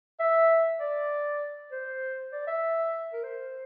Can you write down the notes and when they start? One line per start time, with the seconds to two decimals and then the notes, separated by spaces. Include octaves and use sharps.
0.20 E5
0.80 D5
1.72 C5
2.32 D5
2.47 E5
3.13 A#4
3.23 C5